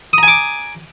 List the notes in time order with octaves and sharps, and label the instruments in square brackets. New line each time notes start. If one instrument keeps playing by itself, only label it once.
[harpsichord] D#6
A#5
G#5
D6